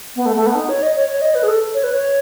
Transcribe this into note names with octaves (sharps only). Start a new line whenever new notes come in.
B3
A3
A3
B3
D#4
C#5
D#5
C#5
C#5
D#5
B4
G#4
A4
C#5
B4
C#5